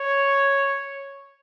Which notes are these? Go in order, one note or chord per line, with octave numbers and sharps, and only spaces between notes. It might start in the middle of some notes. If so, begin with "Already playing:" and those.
Already playing: C#5